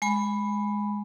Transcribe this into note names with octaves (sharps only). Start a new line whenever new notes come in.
G#3 G#5 B5